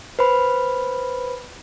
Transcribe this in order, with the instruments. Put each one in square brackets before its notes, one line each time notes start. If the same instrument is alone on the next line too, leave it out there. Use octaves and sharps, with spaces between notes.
[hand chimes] B4 C5 B5